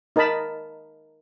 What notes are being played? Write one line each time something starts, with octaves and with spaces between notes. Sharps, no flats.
D#4 A#4 D#5 A5 B5